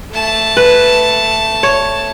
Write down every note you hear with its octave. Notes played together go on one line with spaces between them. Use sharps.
A3 A5
B4
C#5